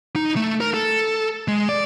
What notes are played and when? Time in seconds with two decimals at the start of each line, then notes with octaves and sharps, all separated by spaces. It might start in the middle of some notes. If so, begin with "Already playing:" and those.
0.16 D#4
0.36 A3
0.61 A#4
0.74 A4
1.48 G#3
1.69 D5